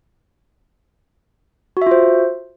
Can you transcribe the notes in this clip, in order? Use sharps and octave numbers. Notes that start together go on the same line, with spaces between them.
F4 F#4 C5 E5